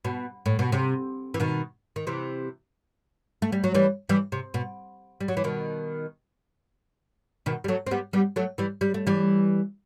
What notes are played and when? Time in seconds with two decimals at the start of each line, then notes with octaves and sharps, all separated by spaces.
0.05 B2
0.46 A2
0.59 B2
0.72 C3
1.34 E3
1.40 B2 D#3
1.96 D#3
2.07 C3 E3
3.42 A3
3.52 G3
3.64 F#3
3.74 E3 G3
4.09 E3 G3
4.32 C3
4.54 B2
5.21 G3
5.28 F#3
5.37 E3
5.44 B2 D#3
7.46 B2 D#3
7.64 G3
7.68 F#3 A3
7.87 C4
7.91 G3 B3
8.13 G3 B3
8.36 F#3 A3
8.58 E3 G3
8.81 G3
8.94 A3
9.07 E3 G3